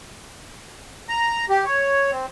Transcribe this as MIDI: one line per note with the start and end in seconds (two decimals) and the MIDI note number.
1.09 1.46 82
1.49 1.65 67
1.65 2.11 73
2.12 2.26 60